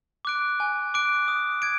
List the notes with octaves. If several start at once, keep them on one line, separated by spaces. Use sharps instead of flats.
D6 F#6 D7
G#5
D6 F#6 D7
D#6
G#6 D7